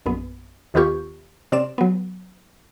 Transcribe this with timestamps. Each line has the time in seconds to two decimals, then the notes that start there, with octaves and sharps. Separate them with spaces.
0.06 A#1 F#2 B3
0.74 D#2 D#3 B3 F4 G4 C#6
1.52 C3 C4 D5 E7
1.78 F#3 B3